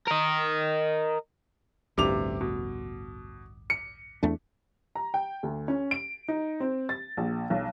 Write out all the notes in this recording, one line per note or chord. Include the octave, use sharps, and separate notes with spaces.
A#4 D#5
A1 D2 G2 C3 D6 F7
B2
C#7
E2 A3 D4
A#5
G5
D2
C#4
D7
D#4
C4
A6
A#1
B1